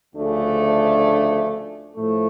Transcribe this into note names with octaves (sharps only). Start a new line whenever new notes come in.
D2 C#3 F3 A3 D4
A2 F3 A3